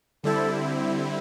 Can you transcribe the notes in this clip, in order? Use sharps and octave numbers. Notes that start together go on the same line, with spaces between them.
D3 G3 C4 E4 A4